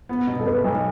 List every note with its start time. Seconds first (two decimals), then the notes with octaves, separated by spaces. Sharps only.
0.09 B3
0.27 B2
0.40 A4
0.45 B2 B4
0.64 B1